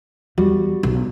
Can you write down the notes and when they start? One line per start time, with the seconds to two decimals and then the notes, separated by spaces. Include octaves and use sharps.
0.38 E2 G3 F#4
0.83 B1